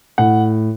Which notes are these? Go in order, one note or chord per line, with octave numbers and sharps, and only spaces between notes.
A2 F#5